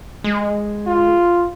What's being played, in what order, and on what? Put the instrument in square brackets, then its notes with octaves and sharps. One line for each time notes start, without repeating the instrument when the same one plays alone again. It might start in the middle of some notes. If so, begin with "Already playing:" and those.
[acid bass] G#3
[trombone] F4